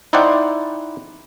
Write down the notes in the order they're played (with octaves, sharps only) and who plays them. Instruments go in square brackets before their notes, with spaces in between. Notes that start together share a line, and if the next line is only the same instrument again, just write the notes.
[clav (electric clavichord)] D#4 E4 C5 D5 F#5 G5